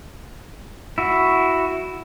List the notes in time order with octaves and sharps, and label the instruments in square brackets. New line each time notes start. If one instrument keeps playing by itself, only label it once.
[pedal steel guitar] E4 F#4